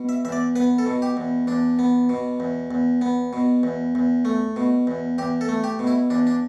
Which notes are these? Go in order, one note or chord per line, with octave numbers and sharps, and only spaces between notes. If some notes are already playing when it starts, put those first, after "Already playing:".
Already playing: B2
E5
E2 E5
D5
B3 B4
A4
B2
G4
E2
E2 D4
B3
B2
E2
E2
B3
B2
E2
E2
A3
B2
E2
E2 G4
A4
A3
G4
B2
E4
E2 D4
D4